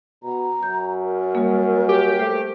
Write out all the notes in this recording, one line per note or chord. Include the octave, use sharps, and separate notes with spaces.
B2 A#5
F#2 G6
A#4
G3 A#3
G4
A3 C5